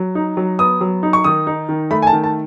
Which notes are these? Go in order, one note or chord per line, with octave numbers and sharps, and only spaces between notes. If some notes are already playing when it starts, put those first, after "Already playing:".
Already playing: F#3
D#4
F#3
B3 D#6
F#3
D#4
C#6
D#3 D#6
D#4
D#3
A3 B5
G#5
A5
D#3
A5